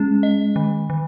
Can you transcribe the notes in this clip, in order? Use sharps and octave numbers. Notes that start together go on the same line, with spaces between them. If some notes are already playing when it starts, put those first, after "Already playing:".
Already playing: G#3 C#4
D#5
D#3
D#3